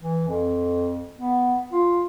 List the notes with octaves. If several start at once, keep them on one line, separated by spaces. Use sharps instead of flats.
E3
F2
B3
F4